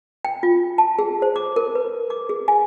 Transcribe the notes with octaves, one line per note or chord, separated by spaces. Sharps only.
G5
F4
A5
G#4
C5
D6
A#4
B4
D6
G#4
G#5